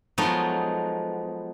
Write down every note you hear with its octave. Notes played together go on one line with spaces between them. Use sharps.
F3 F#3 G#3 A3 B3 D#4